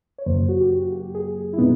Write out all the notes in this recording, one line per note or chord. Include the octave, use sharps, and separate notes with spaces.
C#5
F#2 C#3 F#3 A#3 C5
F#4
G4
F#4
G4
G#4
G#4
E4
B2 G#3 B3 D#4